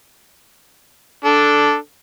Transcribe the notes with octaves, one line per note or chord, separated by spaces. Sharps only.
D4 A4